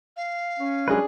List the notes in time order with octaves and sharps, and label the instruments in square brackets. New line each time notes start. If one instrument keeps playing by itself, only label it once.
[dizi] F5
[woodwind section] C#4
[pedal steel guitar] F#3 G#3 B4 [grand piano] D4 G#4